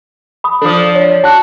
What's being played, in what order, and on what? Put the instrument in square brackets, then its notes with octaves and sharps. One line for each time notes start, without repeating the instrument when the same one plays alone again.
[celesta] B5 D#6
[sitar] F3 D4 [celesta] A4 D#6
[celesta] C#5
[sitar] F#4 [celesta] A5 F#6